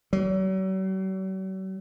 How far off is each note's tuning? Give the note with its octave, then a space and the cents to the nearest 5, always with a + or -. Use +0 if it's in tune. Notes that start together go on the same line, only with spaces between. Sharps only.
F#3 +45